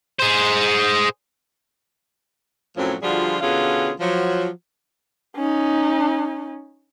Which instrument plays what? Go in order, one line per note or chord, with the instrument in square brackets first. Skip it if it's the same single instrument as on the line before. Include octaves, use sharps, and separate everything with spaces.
[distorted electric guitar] G#4 C5
[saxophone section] F#2 A2 F3 F#3 C4 C#4
D3 F3 G3 F4 F#4 G#4
B2 D3 C#4 F4 G#4 F5
F3 F#3
[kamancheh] C#4 D#4